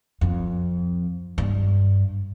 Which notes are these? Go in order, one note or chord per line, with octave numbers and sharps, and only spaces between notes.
F2
G2